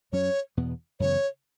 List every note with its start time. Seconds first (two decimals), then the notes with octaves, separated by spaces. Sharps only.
0.12 F#2 F#3 C#4 C#5
0.57 E2 B2 B3
1.00 F#2 C#3 E3 B3 C#5